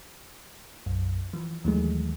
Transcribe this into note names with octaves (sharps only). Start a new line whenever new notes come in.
B1 F#2
E3 F3
D#2 E3 F#3 G#3 A3